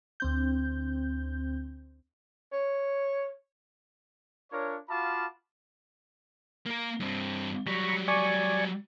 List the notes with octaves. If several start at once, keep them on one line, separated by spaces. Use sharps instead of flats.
D2 C4 G6
C#5
D4 F4 A#4 C#5
F4 F#4 F5 A5 B5 D6
A#3 A#4
G2 C4
F#3 G3 A#5 B5 C#6
D5 G#5 C#6